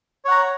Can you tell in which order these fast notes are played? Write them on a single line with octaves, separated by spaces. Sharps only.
C#5 F#5 A#5